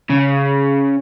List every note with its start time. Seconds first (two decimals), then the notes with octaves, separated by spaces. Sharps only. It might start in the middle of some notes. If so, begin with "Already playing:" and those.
0.10 C#3